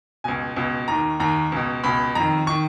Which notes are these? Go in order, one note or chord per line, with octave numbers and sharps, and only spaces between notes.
C#2 B2 G#5
C#2 B2
D#2 D#3 A#5
D#2 D#3 A#5
C#2 B2
C#2 B2 B5
F2 D#3 A#5
D#3 C#6